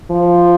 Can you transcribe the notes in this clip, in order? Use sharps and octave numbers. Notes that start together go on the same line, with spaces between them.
F3